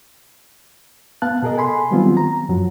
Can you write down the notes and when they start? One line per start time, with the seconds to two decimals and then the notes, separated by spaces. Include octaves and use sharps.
1.22 B3 F5 A5 F#6
1.42 B2 G#4 A#4 D#5
1.57 A4 G#5 B5 C6
1.91 D#3 F#3 G3 B3 C4 F4
2.17 A#5
2.49 F#2 F3 F#3